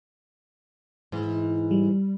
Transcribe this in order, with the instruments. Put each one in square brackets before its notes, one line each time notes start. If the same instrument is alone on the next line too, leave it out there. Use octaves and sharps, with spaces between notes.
[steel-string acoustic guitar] G#2 E3
[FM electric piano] G3